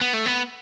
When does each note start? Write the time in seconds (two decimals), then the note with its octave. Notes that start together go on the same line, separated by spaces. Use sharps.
0.01 B3
0.14 A3
0.26 B3